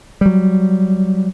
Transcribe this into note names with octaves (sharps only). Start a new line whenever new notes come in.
F#3 G3